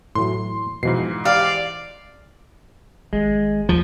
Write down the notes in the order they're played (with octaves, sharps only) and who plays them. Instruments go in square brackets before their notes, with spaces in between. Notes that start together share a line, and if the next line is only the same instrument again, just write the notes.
[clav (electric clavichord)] A2 E3 F#3 [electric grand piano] C6
[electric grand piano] G#2 E3 C7 [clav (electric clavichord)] B2 F3
[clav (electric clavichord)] G4 [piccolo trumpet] D5 [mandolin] F5
[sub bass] G#1 [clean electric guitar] G#3
[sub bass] D2 [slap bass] F3